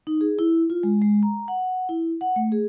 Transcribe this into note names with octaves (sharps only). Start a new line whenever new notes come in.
D#4
G#4
E4
F4
G#3
G#3
A#5
F#5
E4
F#5
A3
G#4